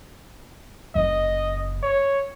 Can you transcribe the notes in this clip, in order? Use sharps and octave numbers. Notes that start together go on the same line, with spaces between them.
F#1 D#5
C#5